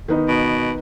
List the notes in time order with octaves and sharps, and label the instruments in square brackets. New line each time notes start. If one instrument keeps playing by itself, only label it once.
[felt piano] D#3 B3 D#4
[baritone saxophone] B2